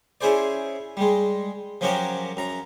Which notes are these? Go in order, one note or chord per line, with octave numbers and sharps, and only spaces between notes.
C#4 E4 G#4 C5 D5
G3 G#3
F3 F#3 C#4 F#4 G4 A#4
F#2 A#5